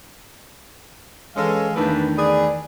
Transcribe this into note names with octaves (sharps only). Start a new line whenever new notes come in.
E3 G#3 C#4 A4 F5
E2 D#3 E3 A3 D4 B4 A5
G#4 B4 D5